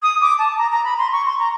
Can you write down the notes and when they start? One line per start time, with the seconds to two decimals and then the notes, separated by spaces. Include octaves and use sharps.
0.02 D#6
0.21 D6
0.38 A5
0.57 A#5
0.71 A#5
0.84 B5
0.98 C6
1.12 C#6
1.26 C6
1.39 A#5